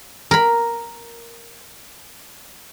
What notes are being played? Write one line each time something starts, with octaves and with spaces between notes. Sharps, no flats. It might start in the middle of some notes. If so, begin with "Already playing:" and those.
A#4 B5